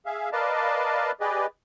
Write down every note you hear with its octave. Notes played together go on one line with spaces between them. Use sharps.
G#4 E5 F5
A#4 B4 D5 D#5 F5 A5
G4 G#4 B4 D5 D#5